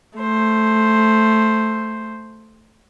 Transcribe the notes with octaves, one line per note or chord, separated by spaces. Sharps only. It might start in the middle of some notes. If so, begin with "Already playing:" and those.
A3 C5